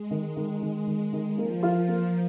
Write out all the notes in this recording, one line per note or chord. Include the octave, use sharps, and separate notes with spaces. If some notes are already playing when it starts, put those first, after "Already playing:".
Already playing: G#3
D#3
D#3
D#3
D#3
D#3
F3 A#3
F4
A#3